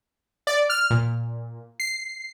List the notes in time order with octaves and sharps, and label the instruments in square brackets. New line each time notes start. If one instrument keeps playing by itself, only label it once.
[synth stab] D5
F6
A#2
C7